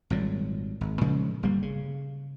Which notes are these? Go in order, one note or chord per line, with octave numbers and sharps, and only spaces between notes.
G#1 A#2 F#3 G3
G#1
A#2 C#3 F3 G#3
G1 G3 A#3
C#3